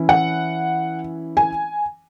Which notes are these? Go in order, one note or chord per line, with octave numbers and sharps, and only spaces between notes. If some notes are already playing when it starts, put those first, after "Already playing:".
Already playing: E3 C#4 E4
F#5
G#5